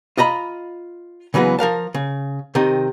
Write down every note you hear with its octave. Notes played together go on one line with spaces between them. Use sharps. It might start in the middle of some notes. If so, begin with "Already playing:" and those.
F4 D#5 A#5 B5
C#3 E3 F#3 G#3 B3
F3 A#4 F5 A5
C#3
C3 D#3 C4 D#4